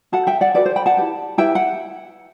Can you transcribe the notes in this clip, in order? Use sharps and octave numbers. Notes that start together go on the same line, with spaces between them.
F#4 A4 F#5 A5
E5 G5
D5 F#5
F#4 A4 B4 D5
C5
G5 B5
F#5 A5
E4 G4 B4
E4 G4 B4 E5 G5
F#5